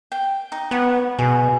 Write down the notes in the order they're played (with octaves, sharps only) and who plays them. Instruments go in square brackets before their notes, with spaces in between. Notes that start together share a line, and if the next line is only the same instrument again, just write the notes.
[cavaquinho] G5
D#4
[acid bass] B3 [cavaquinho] C#5 F#5
[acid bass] B2 [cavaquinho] G#4